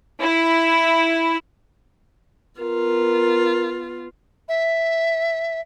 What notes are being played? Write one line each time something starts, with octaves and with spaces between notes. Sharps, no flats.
E4
B3 F4 A#4
E5